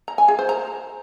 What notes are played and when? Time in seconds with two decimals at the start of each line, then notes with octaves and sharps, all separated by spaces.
0.08 A#5
0.18 G#5
0.28 G#4
0.39 C5
0.49 A#5